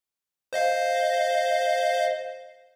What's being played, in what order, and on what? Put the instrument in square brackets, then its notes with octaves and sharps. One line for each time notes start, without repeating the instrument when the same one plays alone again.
[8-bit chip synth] C5 D#5 F5